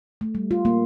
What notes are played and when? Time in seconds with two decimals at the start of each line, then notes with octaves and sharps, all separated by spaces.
0.21 A3
0.35 G3
0.51 F4
0.65 A#3